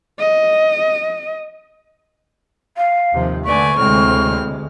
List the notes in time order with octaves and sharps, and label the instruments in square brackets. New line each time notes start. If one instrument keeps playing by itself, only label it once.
[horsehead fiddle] D#5
[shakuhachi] F5
[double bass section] D#2 C3 F3
[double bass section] D3 A3 [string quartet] B4 D5 G#5 [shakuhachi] C#6
[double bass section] D2 C3 G#3 [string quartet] A2 C4 F6